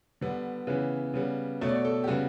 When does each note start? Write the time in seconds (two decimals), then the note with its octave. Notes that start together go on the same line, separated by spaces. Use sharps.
0.21 D3 G3 B3
0.67 C#3 E3 B3 B4
1.14 C#3 G3 B3
1.61 B2 A3 C#5
1.69 D5
1.75 C#5
1.85 A4
2.04 G4
2.07 C#3 G3 B3 F#4